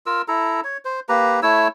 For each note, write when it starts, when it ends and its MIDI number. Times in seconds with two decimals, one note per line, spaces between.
0.06 0.22 65
0.06 0.22 70
0.06 0.22 88
0.28 0.61 64
0.28 0.61 69
0.28 0.61 82
0.64 0.77 73
0.85 1.00 72
1.09 1.40 58
1.09 1.40 67
1.09 1.40 71
1.09 1.40 82
1.43 1.68 57
1.43 1.68 64
1.43 1.68 73
1.43 1.68 88